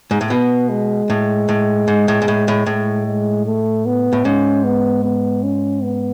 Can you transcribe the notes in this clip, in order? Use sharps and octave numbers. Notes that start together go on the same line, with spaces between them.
G#2
A2
B2 B3
G#3
A2
A2
G#2
A2
G#2
A2
A2
A2 G#3
G#3
A3
B3
A2
G#2 C#4
B3
B3
C#4
B3